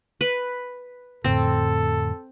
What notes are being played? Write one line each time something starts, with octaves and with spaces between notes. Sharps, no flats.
B4
F2 A2 D3 C4 A4